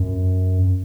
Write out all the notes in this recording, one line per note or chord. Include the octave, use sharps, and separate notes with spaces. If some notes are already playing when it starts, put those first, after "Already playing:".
Already playing: F#2